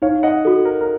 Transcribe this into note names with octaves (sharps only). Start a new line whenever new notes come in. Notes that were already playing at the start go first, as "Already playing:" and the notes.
D#4 C#5 F5
D#5 F#5
F#4 A4
A#4
A#4